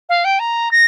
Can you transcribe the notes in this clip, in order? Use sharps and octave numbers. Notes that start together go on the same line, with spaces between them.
F5
G5
A#5
A#6